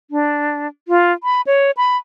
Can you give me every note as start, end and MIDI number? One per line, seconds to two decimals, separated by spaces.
0.11 0.67 62
0.88 1.12 65
1.23 1.41 83
1.47 1.71 73
1.77 1.97 83